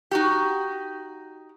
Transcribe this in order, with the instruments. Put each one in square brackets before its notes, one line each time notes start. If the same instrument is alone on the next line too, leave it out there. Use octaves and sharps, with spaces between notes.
[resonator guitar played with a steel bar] D#4 F#4 G4